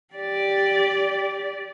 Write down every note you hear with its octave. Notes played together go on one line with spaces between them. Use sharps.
G4 D5